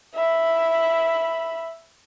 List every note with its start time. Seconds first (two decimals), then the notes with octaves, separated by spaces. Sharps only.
0.15 E5 B5